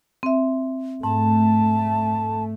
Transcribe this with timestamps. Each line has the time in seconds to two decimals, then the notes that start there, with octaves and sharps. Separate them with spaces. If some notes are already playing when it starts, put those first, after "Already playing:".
0.23 C4 E5
1.03 G#2 A3 A5